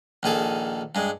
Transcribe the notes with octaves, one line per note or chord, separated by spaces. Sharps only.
A#1 D#3 G#4 A4
G2 G#3